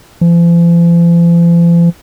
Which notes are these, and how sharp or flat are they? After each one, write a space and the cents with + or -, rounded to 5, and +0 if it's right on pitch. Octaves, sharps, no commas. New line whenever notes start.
F3 -45